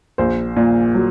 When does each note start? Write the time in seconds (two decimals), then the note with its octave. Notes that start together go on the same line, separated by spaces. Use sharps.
0.18 A#1 C5
0.56 A#2
0.95 F#3